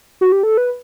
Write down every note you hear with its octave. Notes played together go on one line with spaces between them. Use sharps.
F#4
G4
A4
B4